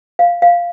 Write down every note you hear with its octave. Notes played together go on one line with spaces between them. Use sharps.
F5
F5